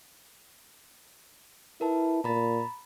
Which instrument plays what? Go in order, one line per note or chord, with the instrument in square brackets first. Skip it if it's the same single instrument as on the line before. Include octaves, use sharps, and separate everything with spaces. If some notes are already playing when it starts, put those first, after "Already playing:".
[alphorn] E4 [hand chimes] A#4 B4 A5
[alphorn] A#2 [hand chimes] A#5 B5 A6